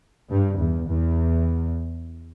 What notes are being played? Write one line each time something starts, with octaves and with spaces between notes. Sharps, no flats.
G2
E2
E2